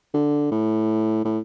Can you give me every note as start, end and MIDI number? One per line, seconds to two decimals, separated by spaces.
0.14 0.47 50
0.51 1.22 45
1.25 1.39 45